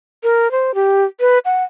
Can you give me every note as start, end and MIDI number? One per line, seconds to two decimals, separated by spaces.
0.23 0.51 70
0.51 0.74 72
0.75 1.05 67
1.20 1.39 71
1.45 1.64 78